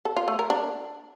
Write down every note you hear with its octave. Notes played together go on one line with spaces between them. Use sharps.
A4
F4
A3
A#4
D4